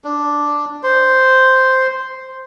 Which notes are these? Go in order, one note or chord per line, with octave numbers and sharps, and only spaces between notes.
D4
C5